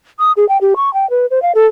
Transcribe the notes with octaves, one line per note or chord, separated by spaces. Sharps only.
D#6
G#4
G5
G4
C#6
G5
B4
C5
F5
A4